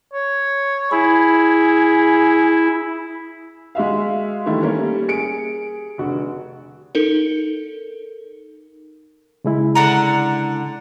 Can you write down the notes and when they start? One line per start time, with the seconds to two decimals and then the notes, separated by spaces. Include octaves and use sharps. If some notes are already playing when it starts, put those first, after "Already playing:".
0.13 C#5
0.92 E4 G#4
3.75 G#3 F#4 E5 F5
4.46 D#3 E3 G3 A3 E4
4.61 G3 A3 A#3 C#4
5.08 G#4 C#7 D7
5.98 F1 D3 F#4
6.95 D#4 A4 A#4
9.45 C#3 G#3 E4
9.75 D3 F#5 A#5